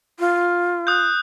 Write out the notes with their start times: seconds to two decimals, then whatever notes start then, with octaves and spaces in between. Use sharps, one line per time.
0.20 F4
0.87 D#6 F#6 G6